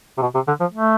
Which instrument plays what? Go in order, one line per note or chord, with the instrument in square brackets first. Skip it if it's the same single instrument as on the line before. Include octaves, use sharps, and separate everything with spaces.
[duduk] C3
B2
C3
D3
F3
A3